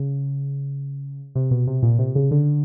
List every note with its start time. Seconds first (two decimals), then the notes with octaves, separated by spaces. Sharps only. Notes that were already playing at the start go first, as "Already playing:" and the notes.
Already playing: C#3
1.35 C3
1.51 B2
1.67 C3
1.82 A#2
1.99 C3
2.15 C#3
2.31 D3